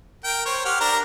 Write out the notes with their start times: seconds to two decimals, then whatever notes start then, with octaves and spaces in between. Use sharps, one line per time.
0.24 A#4 G5
0.46 C5 C#5
0.65 G4 F#5 F6
0.80 D4 A#4 A#5